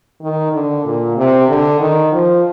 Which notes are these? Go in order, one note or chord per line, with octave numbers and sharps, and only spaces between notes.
D#3
D3
A#2
C3
D3
D#3
F3